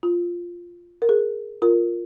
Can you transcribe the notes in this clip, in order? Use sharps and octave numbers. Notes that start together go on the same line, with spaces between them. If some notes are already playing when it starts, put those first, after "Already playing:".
F4
A#4
G#4
F4 A#4